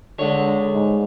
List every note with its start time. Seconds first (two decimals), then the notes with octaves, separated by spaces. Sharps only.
0.19 D3 G#3 C#5
0.74 G#2